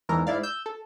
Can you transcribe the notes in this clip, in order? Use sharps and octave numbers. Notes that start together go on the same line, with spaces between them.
E2 G#2 E3 A4 A#4 A#5
G#2 E4 D5 F5
E6 G6
A4